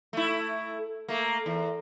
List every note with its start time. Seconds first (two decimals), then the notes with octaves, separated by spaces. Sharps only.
0.13 A3 E4
1.08 A3 A#3
1.46 E2